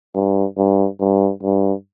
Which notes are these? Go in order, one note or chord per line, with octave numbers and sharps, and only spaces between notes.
G2
G2
G2
G2